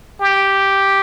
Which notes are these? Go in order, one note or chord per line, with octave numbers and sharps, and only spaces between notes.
G4